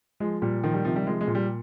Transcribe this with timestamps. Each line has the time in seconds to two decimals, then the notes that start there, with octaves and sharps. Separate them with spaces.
0.20 F3 G#3
0.42 A#2 G3
0.63 D#3 F3
0.74 G3
0.85 C3 F3
0.96 G3
1.06 F3 G#3
1.21 G#3
1.28 A#2
1.35 G3